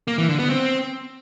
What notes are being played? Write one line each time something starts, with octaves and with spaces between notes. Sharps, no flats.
A#3
E3
D3
B3
C4